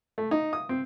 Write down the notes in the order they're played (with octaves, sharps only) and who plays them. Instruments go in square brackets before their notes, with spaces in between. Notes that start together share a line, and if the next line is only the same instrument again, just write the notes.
[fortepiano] A3
D#4
D#6
C4